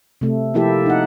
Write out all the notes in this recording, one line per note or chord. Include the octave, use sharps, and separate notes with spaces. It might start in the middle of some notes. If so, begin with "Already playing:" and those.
C3 A3
F3 A#3 E4 G4 A4 E5
D#4 F#5